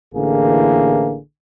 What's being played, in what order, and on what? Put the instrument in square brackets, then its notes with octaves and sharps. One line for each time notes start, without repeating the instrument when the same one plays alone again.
[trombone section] A1 D3 E3 A#3 G#4